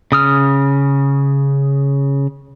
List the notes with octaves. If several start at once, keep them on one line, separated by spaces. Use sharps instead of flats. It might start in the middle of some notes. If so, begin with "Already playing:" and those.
C#3 D#6 F6